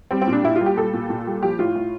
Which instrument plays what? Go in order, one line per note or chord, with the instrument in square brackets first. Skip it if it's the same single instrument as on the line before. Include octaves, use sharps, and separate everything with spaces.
[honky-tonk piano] G3 C4
C4
A#2
D4
A#2 E4
F4
G3
G4
G3 A4
A#2
A#2
G3
F3 G4
A2 F4
A2